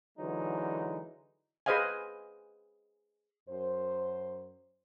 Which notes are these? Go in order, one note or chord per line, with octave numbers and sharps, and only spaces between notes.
D3 E3 F#3 G#3 D#4
G#4 B4 C5 D#5 F5 G#5
F#2 C5